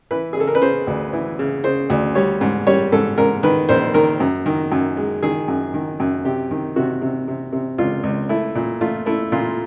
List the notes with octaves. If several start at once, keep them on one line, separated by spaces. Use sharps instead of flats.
E3 B4
G#4
C#3 A4
A#4
B4
C#3 C5
D2
E3
C#3
C#3 C5
D2
G3 C#5
G#2
G3 C#5
G#2 A4
G#2 A#4
D#3 B4
A#1 C5
D#3 A#4
F#2
D#3
F#2
G#3
D#3 G#4
F#2
D#3
F#2
C3 G4
D#3
C3 F#4
C3
C3
C3
C#2 F4
C#2
A3 E4
A#2
A3 F4
A3 E4
A#2 F4